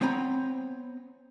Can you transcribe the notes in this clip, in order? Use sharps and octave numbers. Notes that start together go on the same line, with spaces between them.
B3 C4 C#5 G#5 A#5 B5